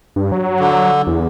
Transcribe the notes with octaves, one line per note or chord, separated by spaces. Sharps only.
G2
F#3
D3
E2